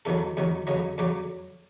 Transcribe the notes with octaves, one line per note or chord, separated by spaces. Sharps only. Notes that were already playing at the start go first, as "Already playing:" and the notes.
E2 C3 D#3 F#3 A4
E2 C3 D#3 F#3
F2 C#3 F#3 D#5
F2 C#3 F#3 D5